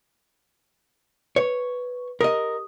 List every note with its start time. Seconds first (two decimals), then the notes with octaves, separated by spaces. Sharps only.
1.36 B4 C#5
2.21 G4 A#4 D#5 D#6